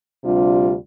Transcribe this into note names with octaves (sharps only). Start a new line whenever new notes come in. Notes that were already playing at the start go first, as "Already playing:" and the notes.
D2 C3 G3 D4 F4